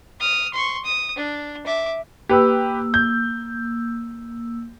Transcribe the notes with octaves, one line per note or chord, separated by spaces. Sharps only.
D#6 F6
C6 C#6
D#6
D4
E5 D6
A#3 G4 B4 E6
G6